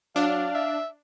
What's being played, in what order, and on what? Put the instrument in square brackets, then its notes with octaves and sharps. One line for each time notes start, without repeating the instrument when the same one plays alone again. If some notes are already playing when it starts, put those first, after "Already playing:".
[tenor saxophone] F#3 [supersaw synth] D4 [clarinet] F5
[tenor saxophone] E5